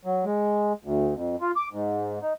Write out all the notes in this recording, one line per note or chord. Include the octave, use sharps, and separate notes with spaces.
F#3
G#3
D2
F2
F4
D6
G#2
D#4